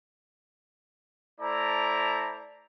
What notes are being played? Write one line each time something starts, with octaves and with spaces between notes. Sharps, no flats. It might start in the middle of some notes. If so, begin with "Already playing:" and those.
A3 E4 C5 D5 A5 A#5